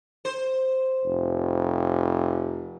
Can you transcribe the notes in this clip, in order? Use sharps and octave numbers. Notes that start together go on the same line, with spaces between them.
C5
F1